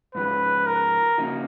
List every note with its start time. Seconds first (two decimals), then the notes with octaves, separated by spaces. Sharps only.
0.15 G#2 F3 G#3 B4
0.67 A#4
1.18 C#3 F3 A#3 D#4 F#4